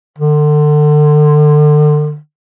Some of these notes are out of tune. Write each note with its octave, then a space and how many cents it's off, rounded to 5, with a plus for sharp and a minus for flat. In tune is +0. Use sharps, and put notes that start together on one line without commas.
D3 +30